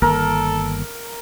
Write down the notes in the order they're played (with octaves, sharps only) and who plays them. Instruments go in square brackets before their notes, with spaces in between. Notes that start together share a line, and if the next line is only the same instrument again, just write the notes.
[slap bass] G1 D#3 A#3 [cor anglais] A4 [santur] A#4